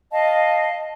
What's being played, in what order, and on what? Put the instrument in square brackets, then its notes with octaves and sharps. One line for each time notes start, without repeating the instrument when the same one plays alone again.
[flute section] D#5 F5 A5